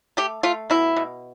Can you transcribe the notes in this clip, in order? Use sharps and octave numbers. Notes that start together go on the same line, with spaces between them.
A3 G4
A3 F4
B2 E4
B2